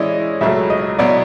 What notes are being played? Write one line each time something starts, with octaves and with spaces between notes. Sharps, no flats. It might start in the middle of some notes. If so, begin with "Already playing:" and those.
Already playing: E3 G#3 C#4 E4 D5 D#5
C#2 C#3 F#3 A3 E5
D#5
B2 F#3 B3 E4 D5